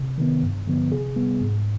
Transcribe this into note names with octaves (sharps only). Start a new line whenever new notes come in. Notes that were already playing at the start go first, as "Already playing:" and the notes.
Already playing: C3
D#3 B3
G2
D3 F3 B3
C3 G#4
G3 B3
G#2